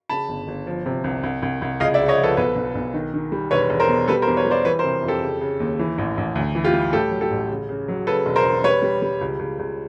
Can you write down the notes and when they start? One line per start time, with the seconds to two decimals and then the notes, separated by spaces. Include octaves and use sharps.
0.09 C#3 A5 B5
0.29 G1
0.48 G1
0.67 F3
0.86 C3
1.04 C2
1.23 C2
1.42 C2
1.62 C2
1.80 C#2 D#5 F5
1.94 D5 E5
1.99 C#3
2.08 C#5 D#5
2.19 F3 A4 B4
2.37 B1 A4 B4
2.56 B1
2.75 B1
2.94 D#3
3.14 D#3
3.32 G3
3.51 E1 B4 C#5
3.70 E1
3.80 A#4 C5
3.89 B2
4.08 G3 A4 B4
4.22 A#4 C5
4.27 E2
4.37 B4 C#5
4.47 G3 C5 D5
4.65 E3 B4 C#5
4.79 A#4 C5
4.84 C3
5.03 F2
5.08 G4 A4
5.22 C#3
5.41 C#3
5.60 D#2
5.79 E3
5.98 A1
6.17 A1
6.35 D2
6.55 E3
6.64 F4 G4
6.73 G3
6.93 A2 G4 A4
7.11 F#3
7.21 G4 A4
7.30 A1
7.50 C#3
7.69 C#3
7.88 F#3
8.07 C#3 A4 B4
8.26 E1
8.36 A#4 C5
8.45 E1
8.64 G3 B4 C#5
8.82 G3
9.02 G3
9.21 C#2
9.39 C#2
9.59 C#2